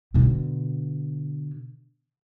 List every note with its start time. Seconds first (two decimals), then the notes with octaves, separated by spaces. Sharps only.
0.14 B2 D3